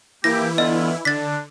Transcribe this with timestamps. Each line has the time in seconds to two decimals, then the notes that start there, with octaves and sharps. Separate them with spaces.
0.24 E3 A#3 E4 G4 A#6
0.58 D3 B3 F4 D#5
1.05 D3 D4 A6 B6